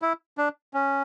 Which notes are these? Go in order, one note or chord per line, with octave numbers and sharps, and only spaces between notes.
E4
D4
C#4